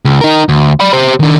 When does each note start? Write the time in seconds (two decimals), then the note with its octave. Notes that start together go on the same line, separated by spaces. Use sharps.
0.05 C#2
0.21 D#4 A#4
0.49 D2
0.80 D5 B5
0.93 G4 C5
1.20 D#3 D4